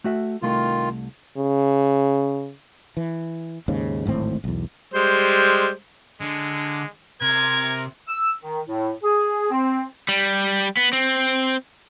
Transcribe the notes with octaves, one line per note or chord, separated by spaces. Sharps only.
A3 F#4 E5
C2 D#3 A3 F4 C6
C#3
E3
D#2 G#2 C#3
D1 G#1 A2 C4
B1 E2
G3 G#3 C5
D3 G#3
C3 A#4 G#6
E6
D#3
A2
G#4
C4
G3
B3
C4